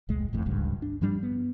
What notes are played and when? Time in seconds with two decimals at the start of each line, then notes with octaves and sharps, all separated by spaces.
0.09 F1 C#2 A#2 G#3
0.33 G#1 F2 A2
0.46 D1 G#1 C#2 G2
0.82 D4
1.01 G2 F3 G3 D4
1.23 B3